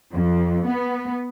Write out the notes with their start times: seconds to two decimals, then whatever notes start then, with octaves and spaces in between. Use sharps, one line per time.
0.12 F2
0.66 B3